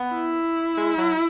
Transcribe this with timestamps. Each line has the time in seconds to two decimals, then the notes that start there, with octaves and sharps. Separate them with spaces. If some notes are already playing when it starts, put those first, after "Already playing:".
Already playing: B3
0.14 E4
0.77 G#3
0.98 F#3